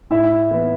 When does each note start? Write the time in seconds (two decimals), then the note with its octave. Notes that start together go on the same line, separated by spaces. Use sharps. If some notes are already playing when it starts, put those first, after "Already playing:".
0.10 A2 E4 E5
0.51 E3 B3